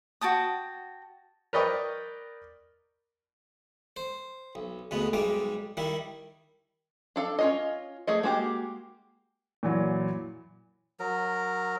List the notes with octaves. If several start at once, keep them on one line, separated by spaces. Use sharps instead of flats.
F#4 G5 A5 D#6
A#4 B4 D5 D#5 G5 C#6
C5
B1
D2 B2 G#3 B3
B1 G#2 G3 G#3 D6
D#3 G3 E4
D4 A4 F5
C#4 F4 D#5
A3 G#4 D#5
G#3 A#3 F#4 G4
A#2 E3 F#3
F#3 A#4